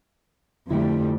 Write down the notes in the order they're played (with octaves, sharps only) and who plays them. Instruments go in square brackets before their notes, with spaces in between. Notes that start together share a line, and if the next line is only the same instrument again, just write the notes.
[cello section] F2 G3 A3 [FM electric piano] D3 E4